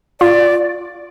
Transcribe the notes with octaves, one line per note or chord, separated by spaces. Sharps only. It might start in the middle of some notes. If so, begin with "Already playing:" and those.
F4 D5